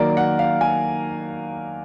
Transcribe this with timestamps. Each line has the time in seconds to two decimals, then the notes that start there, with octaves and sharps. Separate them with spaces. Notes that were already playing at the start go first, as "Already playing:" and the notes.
Already playing: D#3 F#3 A#3 A#4 D5
0.17 F#5
0.39 F5
0.61 G#5